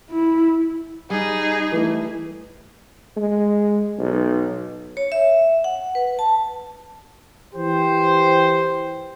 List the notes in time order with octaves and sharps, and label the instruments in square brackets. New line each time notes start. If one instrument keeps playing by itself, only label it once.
[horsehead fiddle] E4
[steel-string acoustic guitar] G3 [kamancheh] D#4 G#4
[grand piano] E3 A3
[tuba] G#3
B1
[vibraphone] C#5
E5
F#5
B4
A5
[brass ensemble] E3 G4 C5